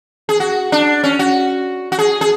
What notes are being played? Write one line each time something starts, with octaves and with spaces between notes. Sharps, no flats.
G#4
F#4
D4
C#4
F#4
F#4
G#4
G#4